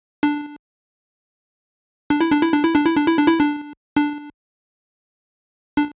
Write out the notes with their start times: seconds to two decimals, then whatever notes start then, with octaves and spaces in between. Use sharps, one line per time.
0.23 D4
2.10 D4
2.21 E4
2.32 D4
2.43 E4
2.53 D4
2.63 E4
2.75 D4
2.85 E4
2.96 D4
3.07 E4
3.18 D4
3.28 E4
3.39 D4
3.96 D4
5.77 D4